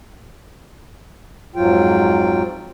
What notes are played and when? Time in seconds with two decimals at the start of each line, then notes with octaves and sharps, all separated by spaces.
1.55 F2 G#2 F#3 F4 G5